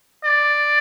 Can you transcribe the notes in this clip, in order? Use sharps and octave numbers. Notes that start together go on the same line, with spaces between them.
D5